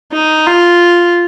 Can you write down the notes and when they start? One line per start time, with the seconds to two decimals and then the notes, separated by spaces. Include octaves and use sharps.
0.12 D#4
0.47 F4